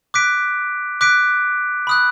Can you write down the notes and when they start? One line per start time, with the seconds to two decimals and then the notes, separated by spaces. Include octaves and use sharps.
0.14 D6 F#6 B6 D7
1.01 D6 F#6 B6 D7
1.87 B5 D#6 F#6